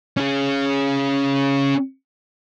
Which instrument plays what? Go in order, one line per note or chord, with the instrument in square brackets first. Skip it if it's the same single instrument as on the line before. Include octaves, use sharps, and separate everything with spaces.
[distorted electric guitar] C#4 G#4